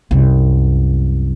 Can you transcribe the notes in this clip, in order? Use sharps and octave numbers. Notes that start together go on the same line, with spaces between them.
C2 F#2